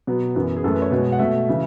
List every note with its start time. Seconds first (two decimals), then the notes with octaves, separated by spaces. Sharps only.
0.07 B2 F#3 B3
0.36 F#2 E3 B3
0.57 G#4
0.64 F#2 E3 A3 A4
0.73 B4
0.82 C#5
0.91 B2 G#3 B3
1.12 F#5
1.19 B2 A3 E5
1.48 C#3 E3